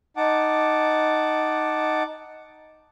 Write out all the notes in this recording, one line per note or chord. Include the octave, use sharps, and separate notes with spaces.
D#4 F#5 A5 D6